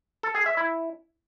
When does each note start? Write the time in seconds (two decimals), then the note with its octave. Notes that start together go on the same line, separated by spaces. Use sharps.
0.23 A4
0.35 G#4
0.46 E5
0.57 E4